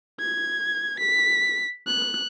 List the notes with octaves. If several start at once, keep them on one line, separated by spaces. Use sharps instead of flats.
G#6
B6
F#6